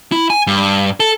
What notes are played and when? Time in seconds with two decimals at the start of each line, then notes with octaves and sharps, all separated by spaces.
0.12 E4
0.30 G#5
0.47 G2
1.00 A4